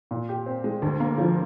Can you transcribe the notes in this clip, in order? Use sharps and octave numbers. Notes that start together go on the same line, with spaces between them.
A#2
G4
C4
G#3
D2
A#3
F3